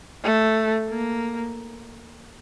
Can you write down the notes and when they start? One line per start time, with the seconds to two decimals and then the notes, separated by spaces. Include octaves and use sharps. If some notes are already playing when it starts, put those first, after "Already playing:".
0.24 A3
0.90 A#3